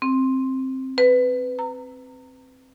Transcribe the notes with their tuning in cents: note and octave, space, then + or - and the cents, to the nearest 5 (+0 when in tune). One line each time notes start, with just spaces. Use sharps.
C4 +10
B4 +20
A#5 -35